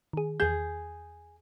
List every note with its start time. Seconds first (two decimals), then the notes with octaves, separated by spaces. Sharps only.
0.13 D#3 G#4
0.40 E2 G#4 G6